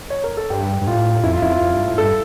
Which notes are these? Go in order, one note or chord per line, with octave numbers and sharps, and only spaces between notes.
C#5
A#4
A4
G2 G4
G2
A2 F4
F2 E4
F4
F2 E4
F4
F2
G2
A2
G2 A4